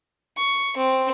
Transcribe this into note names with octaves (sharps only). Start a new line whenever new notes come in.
C#6
C4